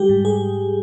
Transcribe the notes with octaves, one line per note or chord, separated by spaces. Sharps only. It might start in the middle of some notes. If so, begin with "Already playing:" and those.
Already playing: G3 G4
G#2
G#4